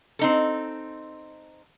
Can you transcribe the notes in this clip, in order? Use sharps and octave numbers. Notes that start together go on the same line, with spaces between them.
C4 D#4 A4